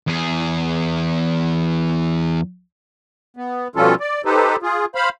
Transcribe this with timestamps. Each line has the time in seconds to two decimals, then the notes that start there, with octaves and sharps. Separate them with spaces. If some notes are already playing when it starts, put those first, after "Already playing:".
0.07 E2 G#4
3.37 B3
3.76 B2 F3 G3 C#4 F4 A4
4.00 D5
4.25 D#4 G4 A4 B4 C5
4.62 F4 G#4
4.95 C5 F5 B5